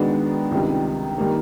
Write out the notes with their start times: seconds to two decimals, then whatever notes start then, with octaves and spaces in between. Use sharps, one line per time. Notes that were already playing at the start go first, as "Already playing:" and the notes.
Already playing: D#3 G#3 B3 D4 F#4
0.51 C#2 C3 D#3 G3
1.18 D#3 G3 A#3